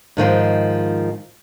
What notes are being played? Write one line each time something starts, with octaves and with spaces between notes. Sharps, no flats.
G#2 D#3 F3 G#3